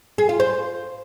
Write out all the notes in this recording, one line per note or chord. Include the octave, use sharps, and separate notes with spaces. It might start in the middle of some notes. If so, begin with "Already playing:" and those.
G#4
F4
C5